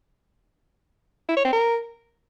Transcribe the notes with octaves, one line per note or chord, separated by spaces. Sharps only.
E4
C#5
C4
A#4